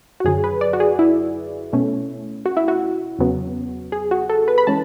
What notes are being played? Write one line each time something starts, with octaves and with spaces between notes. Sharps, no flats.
F#4
F#2 D3 F#3 G#4
B4
D5
F#4
G#4
E4
B2 A3 C#4
F#4
E4
F#4
E2 C#3 F#3 B3
G#4
F#4
A4
B4
B5
E3 G#3 C#4 A5